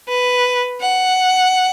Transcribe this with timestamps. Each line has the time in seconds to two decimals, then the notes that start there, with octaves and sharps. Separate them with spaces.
0.08 B4
0.81 F#5